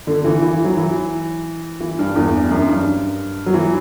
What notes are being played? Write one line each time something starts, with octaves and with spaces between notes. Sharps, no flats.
D3
E3
E3
E3
F#3
E3
E3
G2
E2
G2
F#2
G2
F#3
E3